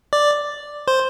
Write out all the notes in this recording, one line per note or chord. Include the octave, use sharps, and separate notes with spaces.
D5
C5